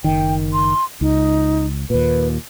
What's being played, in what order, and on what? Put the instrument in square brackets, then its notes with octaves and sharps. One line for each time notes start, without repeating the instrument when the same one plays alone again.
[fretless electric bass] F#1 D#3 [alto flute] G5
[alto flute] C6
[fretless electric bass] C#2 [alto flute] D#4
[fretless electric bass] D#2 A#2 [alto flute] B4